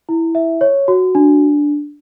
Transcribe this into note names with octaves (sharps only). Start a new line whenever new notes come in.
E4
E5
C#5
F#4
D4